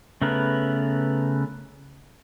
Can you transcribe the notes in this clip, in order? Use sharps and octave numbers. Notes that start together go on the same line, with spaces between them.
C#3 A3 B3 A#4 B4